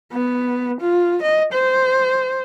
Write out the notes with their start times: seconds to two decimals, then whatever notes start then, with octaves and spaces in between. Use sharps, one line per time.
0.12 B3
0.81 F4
1.22 D#5
1.53 C5